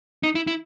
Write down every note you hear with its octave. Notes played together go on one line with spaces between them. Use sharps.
D#4
E4
E4